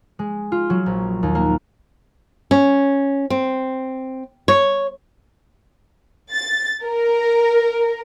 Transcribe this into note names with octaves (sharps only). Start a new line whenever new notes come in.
G#3
F4
F#3
A#1
D#2
A#3
C#4
C4
C#5
A6
A#4